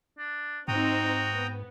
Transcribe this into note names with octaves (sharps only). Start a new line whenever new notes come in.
D4
G#2 C4 D#4 F#4 C5 G5 A#5 D#6
B3